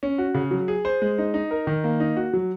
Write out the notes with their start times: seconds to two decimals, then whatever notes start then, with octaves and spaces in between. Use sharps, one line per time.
0.03 C#4
0.18 F#4
0.34 C#3
0.51 F#3
0.68 G#4
0.85 C5
1.02 G#3
1.18 D#4
1.34 D#4
1.51 A#4
1.67 D#3
1.84 A#3
2.00 D#4
2.16 F#4
2.33 F#3